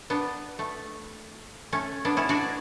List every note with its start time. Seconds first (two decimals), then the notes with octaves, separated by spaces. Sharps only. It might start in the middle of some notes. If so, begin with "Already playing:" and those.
0.10 B3 D4
0.59 A3
1.73 A3 C#4
2.05 B3 D4
2.17 C#4 E4
2.29 D4 F#4